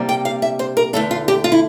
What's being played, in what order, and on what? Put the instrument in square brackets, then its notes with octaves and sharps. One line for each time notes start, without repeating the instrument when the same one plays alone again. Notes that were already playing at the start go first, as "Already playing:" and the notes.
Already playing: [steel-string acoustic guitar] C3 G3 A#3 D4
G5
F5
E5
C5
A#4
E2 D3 A3 A4
F4
G4
F4
E4